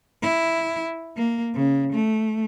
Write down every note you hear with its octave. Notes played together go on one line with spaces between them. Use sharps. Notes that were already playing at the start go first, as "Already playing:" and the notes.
E4
A#3
C#3
A3